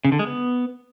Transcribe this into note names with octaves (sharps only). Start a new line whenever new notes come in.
C#3
D3
G#3
B3